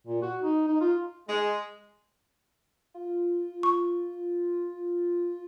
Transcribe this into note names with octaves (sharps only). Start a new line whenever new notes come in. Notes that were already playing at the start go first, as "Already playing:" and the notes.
A#2
F#4
D#4
D#4
F4
G#3
F4
C#6